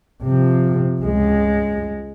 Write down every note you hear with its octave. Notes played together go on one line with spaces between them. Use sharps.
C3 F3
C#2 G#3